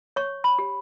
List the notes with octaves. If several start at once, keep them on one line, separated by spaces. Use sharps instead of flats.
C#5 C#6
B5
G4